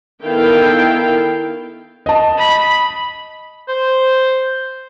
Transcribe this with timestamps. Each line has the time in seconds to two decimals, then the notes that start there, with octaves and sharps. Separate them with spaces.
0.22 D#3 B3 E4 A4 F5 G5
2.06 D#5 A5
2.38 B5
3.69 C5